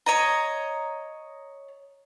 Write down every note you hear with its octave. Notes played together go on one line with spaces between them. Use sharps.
C#5 D#5 A#5